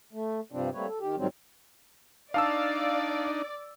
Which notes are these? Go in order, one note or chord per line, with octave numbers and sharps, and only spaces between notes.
A3
G2 C3 F3 G3 C4 D4
G3 A3 A#3 C4 B4 C#5
A4
D#3 G4
G#2 D#3 F#3 G3 C4
D4 D#4 D5 F5 A5 E6